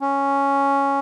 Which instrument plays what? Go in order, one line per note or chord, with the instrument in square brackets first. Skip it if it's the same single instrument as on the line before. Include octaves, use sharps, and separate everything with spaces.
[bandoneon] C#4